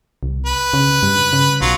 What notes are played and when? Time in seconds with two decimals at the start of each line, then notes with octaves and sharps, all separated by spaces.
0.23 C2
0.46 B4
0.73 C#3
1.03 G2
1.33 C#3
1.61 B1 F#3 F4